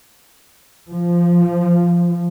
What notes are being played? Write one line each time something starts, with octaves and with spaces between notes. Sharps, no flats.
F3